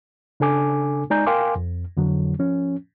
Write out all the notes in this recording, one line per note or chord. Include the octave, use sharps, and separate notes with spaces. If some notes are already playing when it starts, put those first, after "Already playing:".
C#3 D4 A4 G#5 D6
G#3 D#4 D5 G#5 A#5 G6
A#4 F5 G5 G#5 C6 D6
F2
F2 D3 F#3
F3 C#4